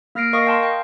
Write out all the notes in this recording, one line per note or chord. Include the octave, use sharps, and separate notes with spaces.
A#3 F6 A#6 C7 D7
A#4 D#5 F5 C#6 D#6 A#6
F5 G5 A5 C6
G5